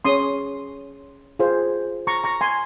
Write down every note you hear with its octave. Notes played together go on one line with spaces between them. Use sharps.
C#4 G#4 C#5 C6 D#6
F4 G#4 C5
A#5 C#6
A#5 C#6
G#5 C6